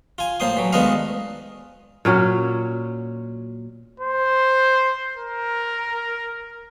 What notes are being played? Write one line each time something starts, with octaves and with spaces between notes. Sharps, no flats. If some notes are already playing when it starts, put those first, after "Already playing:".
F4 G#5
A2 A#3 C5 C6 D#6
E3 F#3
D2 D#3 G#3 B3 D#5 F5
A#2 F#3 C#4
C5
A#4